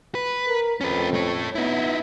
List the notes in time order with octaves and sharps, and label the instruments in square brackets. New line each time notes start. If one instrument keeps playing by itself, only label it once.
[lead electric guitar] B4
[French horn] A#4
[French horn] F2 [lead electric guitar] C#4 B4
[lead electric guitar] A3 C#5
[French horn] B3 [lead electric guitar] D#4 E4